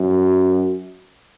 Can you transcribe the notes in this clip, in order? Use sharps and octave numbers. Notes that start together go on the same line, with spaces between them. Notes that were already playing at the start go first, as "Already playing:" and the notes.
Already playing: F#2